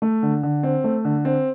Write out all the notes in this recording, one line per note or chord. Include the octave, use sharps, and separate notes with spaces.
A3
D3
D3
C4
A3
D3
C4